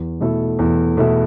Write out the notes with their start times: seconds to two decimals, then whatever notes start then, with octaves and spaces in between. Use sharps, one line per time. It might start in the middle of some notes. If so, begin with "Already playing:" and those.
Already playing: E2
0.20 B2 A3 E4 A4
0.59 E2
0.97 B2 A3 E4 A4